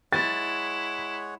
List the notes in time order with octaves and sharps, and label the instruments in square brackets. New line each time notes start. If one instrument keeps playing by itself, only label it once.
[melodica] G#3 C#5 F#5 [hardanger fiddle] E4 [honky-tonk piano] A6